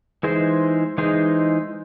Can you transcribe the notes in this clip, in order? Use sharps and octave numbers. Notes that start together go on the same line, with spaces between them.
E3 G#3 D#4 G#4 C5
E3 G#3 D#4 G#4 C5